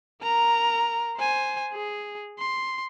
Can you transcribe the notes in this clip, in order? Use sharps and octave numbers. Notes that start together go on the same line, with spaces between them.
A#4 A#5
C5 G#5
G#4
C6